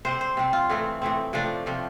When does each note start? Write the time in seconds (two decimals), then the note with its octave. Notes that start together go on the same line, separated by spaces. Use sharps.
0.05 C3 G3 C4 C5
0.21 C5
0.37 C3 G3 C4
0.53 F4
0.70 A2 E3 A3 C4
1.02 A2 E3 A3 C4
1.33 C3 F3 A3 D4
1.66 C3 F3 A3